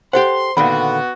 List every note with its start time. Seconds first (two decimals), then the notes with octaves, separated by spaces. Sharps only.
0.13 G4 A4 C5 F#5 C6
0.57 A#2 D3 D#3 B3 F#4 B5